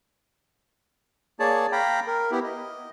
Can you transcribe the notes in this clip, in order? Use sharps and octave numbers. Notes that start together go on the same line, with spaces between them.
A#3 G#4 C#5 D5 A5
F5 G5 A#5 B5
A#4
B3 E4 G4
D#5